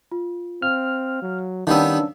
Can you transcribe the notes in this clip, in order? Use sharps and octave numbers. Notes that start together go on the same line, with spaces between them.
F4
C4 F5 F6
F#3
D#3 G3 B3 C#4 D4 F5 E6